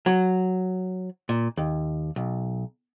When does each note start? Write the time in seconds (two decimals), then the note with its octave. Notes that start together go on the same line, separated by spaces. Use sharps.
0.06 F#3
1.29 A#2
1.57 D#2
2.16 B1